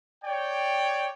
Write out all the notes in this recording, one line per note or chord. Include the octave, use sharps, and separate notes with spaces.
C#5 D5 G5